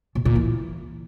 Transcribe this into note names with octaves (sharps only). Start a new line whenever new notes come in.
B2
A#2
E3